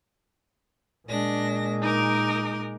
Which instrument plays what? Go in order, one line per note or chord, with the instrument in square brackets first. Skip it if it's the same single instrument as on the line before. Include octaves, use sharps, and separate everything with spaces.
[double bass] A#2 G#3 [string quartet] D4 A#6
[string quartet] D#4 A#4 D6